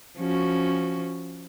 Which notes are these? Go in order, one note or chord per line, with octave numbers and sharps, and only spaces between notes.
F3 C#4 F#4